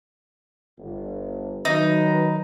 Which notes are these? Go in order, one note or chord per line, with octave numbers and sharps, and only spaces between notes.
G1
D#3 F#3 D#4 B4